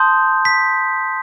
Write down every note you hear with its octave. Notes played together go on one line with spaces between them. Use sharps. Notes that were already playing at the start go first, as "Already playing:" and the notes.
Already playing: A5 C6 D#6 G6
B6